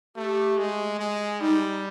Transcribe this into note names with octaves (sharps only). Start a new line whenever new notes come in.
A3 G4
G#3
G#3
G3 D#4